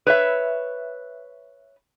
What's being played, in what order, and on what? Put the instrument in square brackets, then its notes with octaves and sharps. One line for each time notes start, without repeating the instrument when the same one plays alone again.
[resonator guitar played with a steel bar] B4 C#5 E5